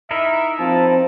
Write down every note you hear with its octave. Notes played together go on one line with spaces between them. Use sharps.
D#4 E4 A#4 E5
A#1 F3 C4 A5